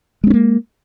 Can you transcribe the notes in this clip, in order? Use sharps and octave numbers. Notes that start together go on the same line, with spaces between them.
G#3 A#3 C4 C#4